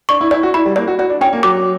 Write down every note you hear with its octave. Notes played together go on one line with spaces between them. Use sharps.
D4 C#6
E4
E4 D5
F#4
E4 B5
G3
A#3 D5
F#4
F#4 D5
D4
C#4 G5
A#3
F#3 D6